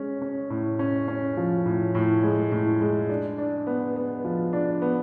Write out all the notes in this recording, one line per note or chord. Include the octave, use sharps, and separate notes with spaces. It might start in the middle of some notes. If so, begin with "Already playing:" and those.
Already playing: G#3 C#4
C#4
A2
C#4
C#4
F3
A2
A2
G#3
A2
G#3
D4
D4
B3
B3
F3
D4
B3